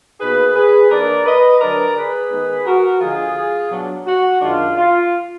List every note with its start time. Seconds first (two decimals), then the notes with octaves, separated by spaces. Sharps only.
0.20 B2 A#3 D#4 G#4 B4
0.55 G#4 B4
0.90 D#3 A#3 D4 A#4 D5
1.25 B4 D#5
1.60 D3 F#3 D4 A#4 D5
1.96 G#4 B4
2.30 D#3 G#3 B3 D#4
2.66 F#4 A#4
3.01 D3 F3 G#3 F4 G#4
3.71 B2 F#3 D4
4.06 F#4
4.40 F#2 D#3 G#3 D4 F4
4.76 F4